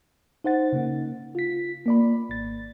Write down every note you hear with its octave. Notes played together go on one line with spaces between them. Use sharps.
D#4 C5 F#5 A6
C#3 A#3
F4 B6
A#3 D5 B5
G#1 A6